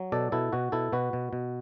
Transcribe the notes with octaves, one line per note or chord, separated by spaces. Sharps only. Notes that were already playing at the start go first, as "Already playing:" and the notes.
Already playing: F#3
B2 A4 D5
B2 E4 A4
B2 F#4
B2 E4 A4
B2 F#4 B4
B2
B2